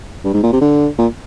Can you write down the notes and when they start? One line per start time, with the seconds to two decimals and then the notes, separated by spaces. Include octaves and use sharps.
0.24 G2
0.34 G#2
0.43 A#2
0.53 C3
0.61 D3
0.98 A#2